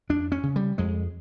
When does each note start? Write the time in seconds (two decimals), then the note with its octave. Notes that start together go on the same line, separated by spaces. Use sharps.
0.09 F2 D4
0.32 C#4
0.43 C#3
0.56 G3
0.78 F2 G#3